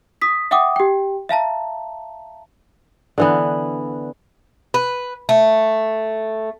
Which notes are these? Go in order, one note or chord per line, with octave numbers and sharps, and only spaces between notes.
D#6 B6
E5 F#5 G5 D6 D#6
G4 G5
E5 F5 A5 A#5
D3 E3 B3
B4
A3